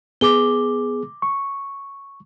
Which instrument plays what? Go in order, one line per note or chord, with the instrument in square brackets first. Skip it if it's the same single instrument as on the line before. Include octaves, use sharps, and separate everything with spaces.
[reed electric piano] B3 G#4 [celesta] D6 G7
[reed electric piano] C#6